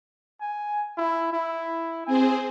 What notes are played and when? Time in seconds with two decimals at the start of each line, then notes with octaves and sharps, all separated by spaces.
0.41 G#5
0.97 E4
1.33 E4
2.07 C4 G#4 C5 G#5